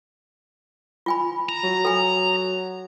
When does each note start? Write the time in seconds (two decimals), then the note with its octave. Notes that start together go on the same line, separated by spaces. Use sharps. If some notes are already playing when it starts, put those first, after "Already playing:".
1.06 F4 G#5 B5
1.49 A#5
1.63 F#3
1.85 A4 G#5